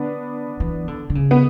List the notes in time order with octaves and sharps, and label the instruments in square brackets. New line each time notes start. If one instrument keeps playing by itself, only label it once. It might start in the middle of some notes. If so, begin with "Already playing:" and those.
Already playing: [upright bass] D3 [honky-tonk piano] B3 D4
[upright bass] E3
D3
D3
C#3
[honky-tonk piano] B3